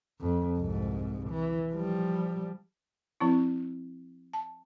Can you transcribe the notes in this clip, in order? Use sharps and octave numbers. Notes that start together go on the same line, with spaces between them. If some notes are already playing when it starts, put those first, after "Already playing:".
F2
C2 G#2
E3
F3 G3
F3 C4 E4
A5